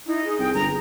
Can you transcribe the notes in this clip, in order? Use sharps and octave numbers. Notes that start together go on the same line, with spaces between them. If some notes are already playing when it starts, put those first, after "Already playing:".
D#4 E4
G#4
C2 G5
G1 A#5